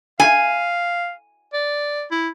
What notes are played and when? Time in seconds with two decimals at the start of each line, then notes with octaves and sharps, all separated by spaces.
0.20 F5 G#5
1.53 D5
2.11 E4